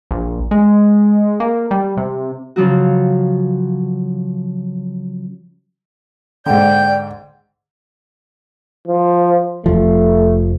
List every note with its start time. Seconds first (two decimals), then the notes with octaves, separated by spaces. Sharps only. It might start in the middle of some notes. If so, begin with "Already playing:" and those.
0.11 A#1
0.51 G#3
1.40 A#3
1.71 G3
1.97 C3
2.56 C#3 F3 F#3 F#4
6.46 G#2 D3 D5 G5 G6
8.88 F3
9.66 F1 F3 A3